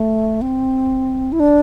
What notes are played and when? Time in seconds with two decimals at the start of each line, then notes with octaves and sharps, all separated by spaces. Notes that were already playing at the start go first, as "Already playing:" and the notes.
Already playing: A3
0.42 C4
1.32 E4
1.40 D4